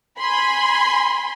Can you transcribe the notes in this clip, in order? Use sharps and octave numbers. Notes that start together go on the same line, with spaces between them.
G#5 B5 C6